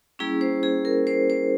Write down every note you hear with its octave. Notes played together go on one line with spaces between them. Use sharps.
G3 A#3 C#4 E4 G#4
C5
G#4
A#4
C5
C5